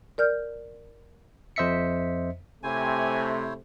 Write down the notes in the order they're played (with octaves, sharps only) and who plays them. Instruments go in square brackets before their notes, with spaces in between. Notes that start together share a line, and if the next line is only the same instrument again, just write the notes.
[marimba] A#4 D5 F6 G6
[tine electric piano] F2 C5 D#5 E5 B6 C#7
[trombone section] C3 A3 [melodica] E4 C5 C#5 [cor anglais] G#5